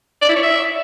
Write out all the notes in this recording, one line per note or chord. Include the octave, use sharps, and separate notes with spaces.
D5
E4
C#5
E5